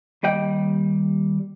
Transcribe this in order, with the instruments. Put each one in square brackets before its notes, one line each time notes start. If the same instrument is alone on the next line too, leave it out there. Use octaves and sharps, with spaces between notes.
[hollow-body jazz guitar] D#2 G3 D#5 G5